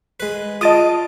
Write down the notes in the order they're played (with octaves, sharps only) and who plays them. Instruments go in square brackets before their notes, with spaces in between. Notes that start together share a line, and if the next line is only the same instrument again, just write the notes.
[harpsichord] G#3 B4
[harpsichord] F4 D6 [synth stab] D#5 A5 D#6